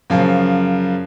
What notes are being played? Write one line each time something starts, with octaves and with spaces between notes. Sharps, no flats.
F#2 C#3 F3